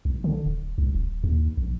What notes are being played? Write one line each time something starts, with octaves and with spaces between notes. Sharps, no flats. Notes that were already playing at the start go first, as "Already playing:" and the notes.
B1
D3
D1
C2
D1
D#2
A#1